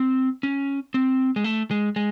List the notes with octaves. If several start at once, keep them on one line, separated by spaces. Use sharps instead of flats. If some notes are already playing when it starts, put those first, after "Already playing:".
Already playing: C4
C#4
C4
G#3
A3
G#3
G#3